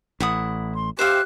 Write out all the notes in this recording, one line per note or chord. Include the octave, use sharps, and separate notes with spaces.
A1 E4 F#5 D#6
C6
G4 C5 E5 F5 F#6